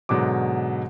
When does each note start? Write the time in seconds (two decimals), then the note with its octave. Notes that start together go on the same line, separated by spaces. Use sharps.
0.09 G#2 B2 D3 F#3 D6